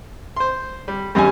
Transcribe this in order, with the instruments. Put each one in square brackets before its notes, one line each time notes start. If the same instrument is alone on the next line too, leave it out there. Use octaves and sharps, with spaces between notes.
[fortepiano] C5 C6
G3
[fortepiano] G#1 F#2 [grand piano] G3 G#5